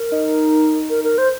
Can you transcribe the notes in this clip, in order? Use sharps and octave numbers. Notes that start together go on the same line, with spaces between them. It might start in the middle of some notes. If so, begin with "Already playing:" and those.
Already playing: A#4
D#4
A#4
A#4
C5